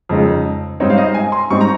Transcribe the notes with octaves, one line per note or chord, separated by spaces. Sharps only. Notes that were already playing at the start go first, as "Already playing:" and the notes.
F2 C#3 G#3 D#4
G#2 G3 C4 D#4 C#5
F5
D#5
G#5
C6
G#2 G3 C4 D#4 C#6
A#5